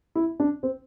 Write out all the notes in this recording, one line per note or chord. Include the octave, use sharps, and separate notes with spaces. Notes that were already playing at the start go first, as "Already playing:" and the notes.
E4
D4
C4